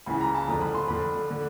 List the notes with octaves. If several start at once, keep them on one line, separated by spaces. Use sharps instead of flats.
C#2 C#3 E3 B5
A#5
A5
F2 D3 A#5
B5
C6
F2 D3 B5
D3